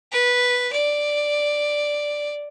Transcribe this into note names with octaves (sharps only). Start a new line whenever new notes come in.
B4
D5